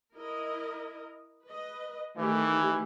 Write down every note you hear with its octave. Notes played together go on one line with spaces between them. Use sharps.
E4 A#4 D#5
B4 D#5
D#3 E3 A3 G4